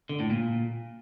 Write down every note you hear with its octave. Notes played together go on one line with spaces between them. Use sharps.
D3
A2
A#2